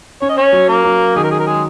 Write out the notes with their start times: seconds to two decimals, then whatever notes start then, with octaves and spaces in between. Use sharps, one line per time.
0.22 C#4 C#5
0.29 D#5
0.38 C#4 C#5
0.53 F#3
0.68 A#3 A#4
0.85 F#3
1.16 D#3 G#4
1.24 A#4
1.31 G#4
1.40 A#4
1.46 G#3 G#4